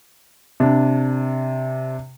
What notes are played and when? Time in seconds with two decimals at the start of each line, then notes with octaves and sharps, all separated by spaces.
0.60 C3 D4